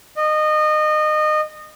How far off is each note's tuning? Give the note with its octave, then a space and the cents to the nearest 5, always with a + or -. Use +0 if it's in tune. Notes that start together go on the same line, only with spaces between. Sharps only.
D#5 -25